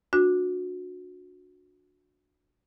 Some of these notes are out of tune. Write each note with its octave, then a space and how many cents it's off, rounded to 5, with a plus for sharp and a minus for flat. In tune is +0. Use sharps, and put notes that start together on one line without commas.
D4 +0 F#4 -25